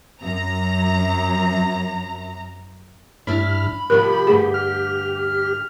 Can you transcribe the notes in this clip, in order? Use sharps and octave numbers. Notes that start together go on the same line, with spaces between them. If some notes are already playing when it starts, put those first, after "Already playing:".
F#2 A#5
G2 D4 E4 B5 F6
C3 F3 G3 G4 A#4
D2 G2 G#4
F6